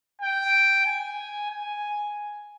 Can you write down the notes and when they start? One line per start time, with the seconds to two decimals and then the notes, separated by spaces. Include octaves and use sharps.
0.21 G5
0.86 G#5
1.51 G#5